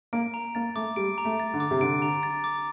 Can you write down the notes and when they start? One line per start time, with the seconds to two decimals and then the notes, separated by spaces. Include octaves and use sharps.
0.13 A#3 D7
0.34 A#5
0.55 A#3 A6
0.75 A3 D6
0.96 G3 D7
1.18 A#5
1.25 A3
1.40 A6
1.54 D3
1.60 D6
1.71 C3
1.81 D3 D7
2.02 A#5
2.23 A6
2.44 D6